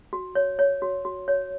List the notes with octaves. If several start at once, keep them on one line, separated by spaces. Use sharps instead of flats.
F#4
C#5
C#5
F#4
F#4
C#5